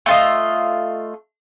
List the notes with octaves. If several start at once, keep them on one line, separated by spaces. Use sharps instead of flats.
A3 F4 D#5